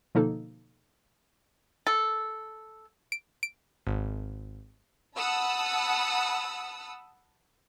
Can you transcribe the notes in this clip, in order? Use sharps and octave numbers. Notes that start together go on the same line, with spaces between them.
B2 D3 F3 A#3 D#4 A4
A4
D7
D7
G#1
F#5 A5 B5 D#6 E6